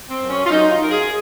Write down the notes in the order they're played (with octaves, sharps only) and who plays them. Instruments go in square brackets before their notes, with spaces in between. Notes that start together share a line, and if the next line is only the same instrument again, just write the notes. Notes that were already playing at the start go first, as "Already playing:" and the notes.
[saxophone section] C4
F#2
C#4
F4
F#2 D#4
F4
F#2 A#4
G#4